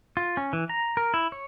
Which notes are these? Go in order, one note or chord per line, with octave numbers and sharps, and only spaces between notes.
F4
C#4
E3
A#5
A#4
E4
C#5